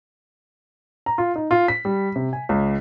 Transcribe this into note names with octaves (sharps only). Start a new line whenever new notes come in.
A#5
F4
D#4
F4
B6
G3
C3
G#5
C#2